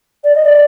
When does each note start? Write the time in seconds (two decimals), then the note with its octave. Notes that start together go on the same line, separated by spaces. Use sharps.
0.24 D5
0.35 D#5
0.45 D5